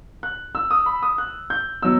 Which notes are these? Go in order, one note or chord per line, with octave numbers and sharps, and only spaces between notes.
F#6
E6
D#6
B5
D#6
F#6
G6
B2 F#3 E6